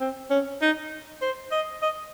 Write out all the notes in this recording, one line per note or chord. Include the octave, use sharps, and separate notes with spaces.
C4
C#4
D#4
C5
D#5
D#5